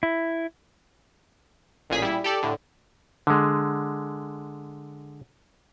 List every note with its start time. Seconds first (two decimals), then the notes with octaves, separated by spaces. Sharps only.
0.03 E4
1.90 A1 A#2 G#4 B6
2.02 G3 E4
2.24 G4 A4 D5
2.43 A2 D3
3.27 D3 G#3